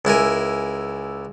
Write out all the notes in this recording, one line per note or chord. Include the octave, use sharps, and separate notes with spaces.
C#2 E4 A#4 G#5